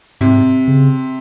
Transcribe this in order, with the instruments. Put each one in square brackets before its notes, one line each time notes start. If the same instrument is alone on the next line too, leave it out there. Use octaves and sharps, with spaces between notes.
[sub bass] G#2 [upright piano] C3
[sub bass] C#3